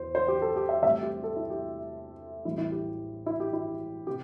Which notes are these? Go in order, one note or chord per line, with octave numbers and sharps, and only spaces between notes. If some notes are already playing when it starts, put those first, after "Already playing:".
Already playing: E2 C5
C5
G4
A4
G4
E5
C2 C3 A3 C4 E5
G4
A4
E4
G4
A1 A2 E3 G3 C4 E4
E4
G4
E4
G4
E4
C3 G4